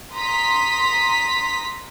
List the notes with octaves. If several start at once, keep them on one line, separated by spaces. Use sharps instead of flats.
A#5 C6 D#6 B6